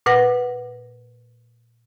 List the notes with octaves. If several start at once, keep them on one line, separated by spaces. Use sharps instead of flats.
A#2 B4 F#5 A#6